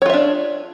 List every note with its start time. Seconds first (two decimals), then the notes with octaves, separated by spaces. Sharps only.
0.02 C#5
0.06 F4
0.10 E5
0.14 D4